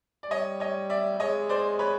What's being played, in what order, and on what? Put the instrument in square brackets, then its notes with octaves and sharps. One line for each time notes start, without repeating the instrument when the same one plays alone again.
[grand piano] D5
[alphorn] G3 [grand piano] C#5 D#5
[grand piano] C#5 D#5
D5 E5
[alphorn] G#3 [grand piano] C#5 D#5
[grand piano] C5 D5
B4 C#5